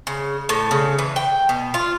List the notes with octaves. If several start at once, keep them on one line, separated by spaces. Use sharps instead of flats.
C#3
A2
C#3
E3
G5
B2
F4